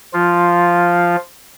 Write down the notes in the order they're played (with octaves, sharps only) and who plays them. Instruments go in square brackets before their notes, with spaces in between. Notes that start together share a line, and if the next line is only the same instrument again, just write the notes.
[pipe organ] F3 F4